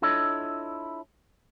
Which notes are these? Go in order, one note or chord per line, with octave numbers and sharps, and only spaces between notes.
D4 E4 F4 A4 C#5 D#5